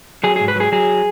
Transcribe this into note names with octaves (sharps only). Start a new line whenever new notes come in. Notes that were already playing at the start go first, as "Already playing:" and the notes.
F#3 G#4
G#2 G#4
B4
F#3 G#4
F#3 G#4